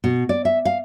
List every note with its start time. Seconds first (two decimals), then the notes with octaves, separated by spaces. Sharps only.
0.04 B2
0.29 D5
0.45 E5
0.65 F5